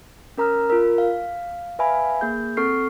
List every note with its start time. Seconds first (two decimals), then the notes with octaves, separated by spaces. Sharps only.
0.38 C#4 A#4 A#5 D#6 F6
0.70 F4 A#4
0.98 F5
1.79 B4 E5 F5 G#5 B5
2.21 A#3 G#4 G6
2.57 C4 A4 C#6 F6 C7